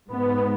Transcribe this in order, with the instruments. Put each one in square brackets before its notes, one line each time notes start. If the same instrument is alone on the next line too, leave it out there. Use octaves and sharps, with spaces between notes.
[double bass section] G#2 B3